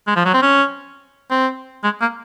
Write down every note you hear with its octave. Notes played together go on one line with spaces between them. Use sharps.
G#3
F3
F#3
C4
C#4
C4
G#3
A#3